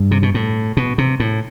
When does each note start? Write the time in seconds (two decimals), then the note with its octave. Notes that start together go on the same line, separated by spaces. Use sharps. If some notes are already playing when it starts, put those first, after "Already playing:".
Already playing: G2
0.11 C3
0.23 B2
0.34 A2
0.77 B2
0.98 C3
1.20 A2